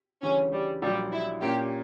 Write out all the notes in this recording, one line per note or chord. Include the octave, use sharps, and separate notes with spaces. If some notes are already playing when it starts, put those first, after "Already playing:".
D2 C#3 E3 G3 C#4
G3
A#1 A#2 F#3 G3
E4
A#2 A#3 C#4 G4